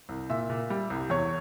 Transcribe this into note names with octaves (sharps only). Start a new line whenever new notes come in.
C2
A#2 E5
A#2
G3
C2
E2 C#5